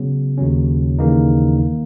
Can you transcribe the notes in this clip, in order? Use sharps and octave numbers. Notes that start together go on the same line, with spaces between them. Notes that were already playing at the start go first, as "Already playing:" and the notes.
Already playing: C#3 F#3 B3
D#2 C#3 F#3 C#4
D#2 C#3 E3 A#3 D#4
D#3 A#3